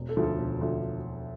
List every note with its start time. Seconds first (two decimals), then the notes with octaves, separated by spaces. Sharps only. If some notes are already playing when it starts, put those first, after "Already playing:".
Already playing: E1
0.09 A4
0.17 D2 D3 F3
0.23 A4
0.39 E1
0.61 D2 D3 F3